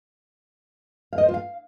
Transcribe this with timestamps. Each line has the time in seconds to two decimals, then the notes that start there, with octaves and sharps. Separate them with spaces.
1.13 F5
1.18 D#5
1.23 C5
1.29 F4
1.34 F5